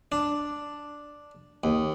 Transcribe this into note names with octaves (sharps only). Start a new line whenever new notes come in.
D4
D#2